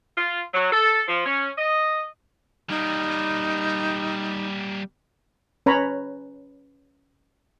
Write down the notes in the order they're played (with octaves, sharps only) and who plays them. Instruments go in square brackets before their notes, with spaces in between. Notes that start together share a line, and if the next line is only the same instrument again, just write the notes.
[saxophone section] F4
F#3
A4
F3
C#4
D#5
[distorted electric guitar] G3 A#3 [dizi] D#4
[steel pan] C#4 B4 C#5 A#5 B5